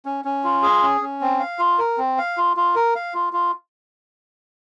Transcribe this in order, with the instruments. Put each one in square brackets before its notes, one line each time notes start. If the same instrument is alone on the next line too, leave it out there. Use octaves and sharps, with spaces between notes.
[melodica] C#4
C#4
F4
G#4
C#4
C#4
C4
F5
F4
A#4
C4
F5
F4
F4
A#4
F5
F4
F4